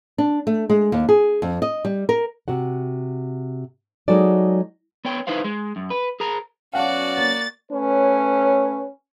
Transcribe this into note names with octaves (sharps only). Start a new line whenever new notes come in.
D4
A3
G#3
D#2
G#4
F2
D#5
G3
A#4
C3 F#4 F#5
F#3 G#3 D#4 F#4 A4 D5
B3 C#5 G5
D#4 E4 B4 C5 F5
G#3
F#2
B4
G#4 A#4 A#5
F#3 B3 C#4 F#4 D5 F5 F#5 A5
A#3 A6
A3 C#4 B4 C#5